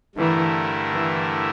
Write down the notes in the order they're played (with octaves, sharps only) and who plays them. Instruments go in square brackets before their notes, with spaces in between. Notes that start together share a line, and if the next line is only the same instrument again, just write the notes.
[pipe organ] G2 D3 A3 E4 A#4 [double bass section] E3
[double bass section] E3